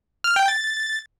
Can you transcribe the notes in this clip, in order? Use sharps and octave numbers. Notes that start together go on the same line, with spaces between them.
F6
G5
A6